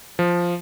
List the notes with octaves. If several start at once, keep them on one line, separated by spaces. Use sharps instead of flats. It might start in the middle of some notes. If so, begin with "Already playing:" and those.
F3